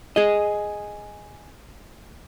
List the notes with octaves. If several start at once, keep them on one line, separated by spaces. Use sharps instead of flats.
G#4 D#5